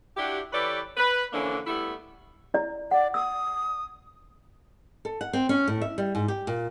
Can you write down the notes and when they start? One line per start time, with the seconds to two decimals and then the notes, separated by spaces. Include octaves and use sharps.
0.17 D4 E4 F#4 G4
0.52 E3 G4 A4 B4 C#5 D5
0.97 B4
1.33 D3 E3 F3 A#3 C#4 D4
1.66 G3 A3 B3 E4
2.54 E4 D5 A#5
2.91 D5 F#5
3.14 D#6 E6
5.05 A4
5.21 F#5
5.33 C4
5.49 C#4
5.68 A2
5.81 E5
5.98 G3
6.15 G#2
6.28 G4
6.47 A#2